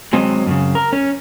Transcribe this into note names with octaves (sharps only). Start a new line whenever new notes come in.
F#3 G#3 C4 D#5
F#2 A2 C#3
A#4
C#4